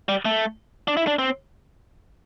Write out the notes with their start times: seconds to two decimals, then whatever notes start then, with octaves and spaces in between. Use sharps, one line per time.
0.09 G3
0.25 A3
0.88 D4
0.97 E4
1.07 D4
1.19 C4